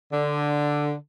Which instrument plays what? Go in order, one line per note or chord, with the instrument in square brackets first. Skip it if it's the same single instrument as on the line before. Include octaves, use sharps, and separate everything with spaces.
[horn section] D3